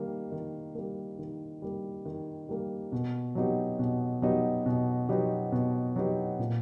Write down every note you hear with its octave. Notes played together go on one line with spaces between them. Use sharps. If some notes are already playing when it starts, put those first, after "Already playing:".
Already playing: D#3 G3 A#3
D#3
G3 A#3
D#3
G3 A#3
D#3
G3 A#3
B2
F#3 B3 D#4 G4
B2
F#3 B3 D#4 G4
B2
F#3 B3 D#4 G4
B2
F#3 B3 D#4 G4
A#2